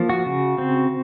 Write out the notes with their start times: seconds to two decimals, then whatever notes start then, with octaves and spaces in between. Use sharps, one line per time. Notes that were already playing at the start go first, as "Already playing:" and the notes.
Already playing: F3 A#3
0.09 F#4
0.26 C#3
0.58 C4